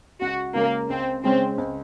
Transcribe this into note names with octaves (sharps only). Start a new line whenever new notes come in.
C#2 F#4
C#3 G#3 A#3 C#4
C#2 C4
C#3 G#3 C4 C#4
C#2